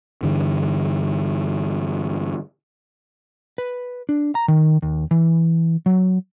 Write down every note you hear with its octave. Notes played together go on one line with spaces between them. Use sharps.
G2 D3 E3
B4
D4
A#5
D#3
D#2
E3
F#3